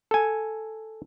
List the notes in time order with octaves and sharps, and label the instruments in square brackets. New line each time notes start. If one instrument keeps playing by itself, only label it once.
[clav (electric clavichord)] A4 G#5